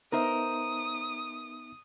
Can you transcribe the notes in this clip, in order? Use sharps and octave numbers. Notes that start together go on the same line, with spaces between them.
B3 D#4 A#4 C5 E5 D#6